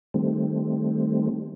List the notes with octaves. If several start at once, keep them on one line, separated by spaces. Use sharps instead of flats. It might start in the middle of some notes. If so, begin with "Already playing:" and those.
D#3 G3 A3 C4